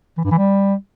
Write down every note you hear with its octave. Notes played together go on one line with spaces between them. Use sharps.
E3
G2
E3
G3